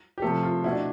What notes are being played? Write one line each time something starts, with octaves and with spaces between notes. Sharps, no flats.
G4
C3 F3 A3 A4
F4
B2 A3 E4
D4